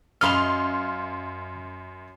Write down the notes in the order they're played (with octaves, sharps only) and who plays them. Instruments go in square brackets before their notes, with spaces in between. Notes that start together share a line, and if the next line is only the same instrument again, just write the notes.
[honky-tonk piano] F#2 C6 F7 [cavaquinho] D#5 F5 B5 [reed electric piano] F6